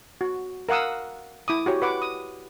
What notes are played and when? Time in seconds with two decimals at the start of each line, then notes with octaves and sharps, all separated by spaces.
0.21 F#4
0.69 A#4 F5 F#5 D#6 E6
1.48 E4 D6 D#6
1.66 F#4 G4 C#5
1.82 B4 F#5 D6
2.02 D#6